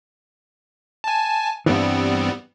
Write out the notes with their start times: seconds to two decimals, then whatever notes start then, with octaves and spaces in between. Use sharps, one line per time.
1.04 G#5 A5
1.66 G2 E3 G3 B3 C4